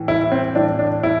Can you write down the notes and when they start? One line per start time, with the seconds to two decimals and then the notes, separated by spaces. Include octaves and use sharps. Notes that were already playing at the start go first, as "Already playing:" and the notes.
Already playing: A2 E3
0.08 E4
0.32 C4
0.55 A2 E3 D4
0.79 D4
1.03 E4